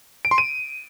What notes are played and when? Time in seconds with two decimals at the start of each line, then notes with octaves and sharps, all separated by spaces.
0.25 D7
0.31 C6
0.38 D#7